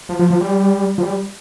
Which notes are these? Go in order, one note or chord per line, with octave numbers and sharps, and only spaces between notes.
F3
F3
F3
G3
F3
G3